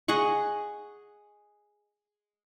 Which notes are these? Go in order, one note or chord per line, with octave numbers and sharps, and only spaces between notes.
G#4 D#5 F#5 C#6